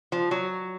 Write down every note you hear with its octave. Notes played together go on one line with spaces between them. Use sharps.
F3
F#3